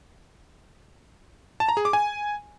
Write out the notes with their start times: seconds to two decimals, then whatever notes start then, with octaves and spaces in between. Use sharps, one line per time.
1.60 A5
1.69 A#5
1.77 G#4
1.85 D6
1.93 G#5